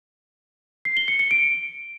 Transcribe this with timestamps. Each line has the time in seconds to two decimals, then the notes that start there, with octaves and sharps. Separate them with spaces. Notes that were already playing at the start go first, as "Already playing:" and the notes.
0.85 C7
0.97 G7
1.08 C#7
1.19 C#7
1.31 D7